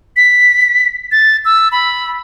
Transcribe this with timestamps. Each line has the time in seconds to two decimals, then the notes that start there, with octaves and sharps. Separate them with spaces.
0.17 B6
1.12 A6
1.45 E6
1.72 B5